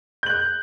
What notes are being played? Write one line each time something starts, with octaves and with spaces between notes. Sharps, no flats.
F#6 G6 F#7